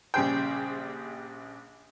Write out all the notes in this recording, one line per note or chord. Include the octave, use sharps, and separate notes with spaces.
A#1 C#3 G3 G#4 C5 G5